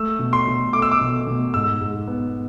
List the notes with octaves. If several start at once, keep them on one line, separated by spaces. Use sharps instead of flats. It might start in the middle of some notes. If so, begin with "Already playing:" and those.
Already playing: A3 E6
B2
C6
B2
A3 D6
E6
D6
B2
B2
G#2 E6
G#2
B3